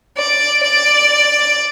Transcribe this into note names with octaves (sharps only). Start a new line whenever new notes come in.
D5
D5